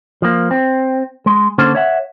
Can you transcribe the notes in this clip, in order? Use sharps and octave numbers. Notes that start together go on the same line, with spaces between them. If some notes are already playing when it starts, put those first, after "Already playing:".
F3 A#3
C4
G#3
D3 A#3 C#4 A4 C5
C#5 E5 F#5